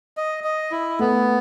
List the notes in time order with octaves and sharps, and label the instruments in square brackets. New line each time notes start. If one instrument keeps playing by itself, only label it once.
[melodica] D#5
D#5
E4
[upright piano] A3 [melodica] B3